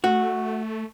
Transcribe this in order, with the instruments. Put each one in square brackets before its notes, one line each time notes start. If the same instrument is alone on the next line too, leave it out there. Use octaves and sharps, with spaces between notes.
[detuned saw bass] A3 [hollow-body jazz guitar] F#4